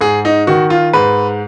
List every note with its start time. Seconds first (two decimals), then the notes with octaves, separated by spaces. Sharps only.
0.01 G#2 G#4
0.25 D#4
0.47 D#3 F#4
0.70 F4
0.93 G#2 B4